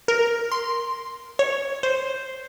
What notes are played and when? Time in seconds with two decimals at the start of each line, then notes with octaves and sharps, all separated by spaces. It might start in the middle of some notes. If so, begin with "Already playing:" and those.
0.08 A#4
0.52 C6
1.39 C#5
1.83 C5